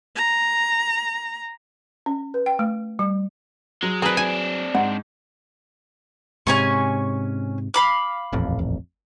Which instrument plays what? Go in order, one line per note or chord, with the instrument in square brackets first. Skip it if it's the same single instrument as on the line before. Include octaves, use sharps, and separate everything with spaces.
[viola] A#5
[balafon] C#4
B4
G5
A3
G3
[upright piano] F#3 [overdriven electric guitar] G#3
[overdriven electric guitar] C4 D4 [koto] G#4 B4 [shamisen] A#4
[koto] G#5
[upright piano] G#2 [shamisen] F#5
[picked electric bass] G#2 C3 [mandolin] C#4 G#5 C#6
[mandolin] F5 B5 D6
[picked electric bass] D#1 A1 F2